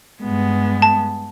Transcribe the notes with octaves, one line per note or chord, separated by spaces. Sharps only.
G2 G#3 B3
A5